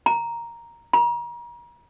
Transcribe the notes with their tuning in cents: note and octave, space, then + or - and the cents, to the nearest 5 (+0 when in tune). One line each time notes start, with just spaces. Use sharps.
A#5 +5
A#5 +35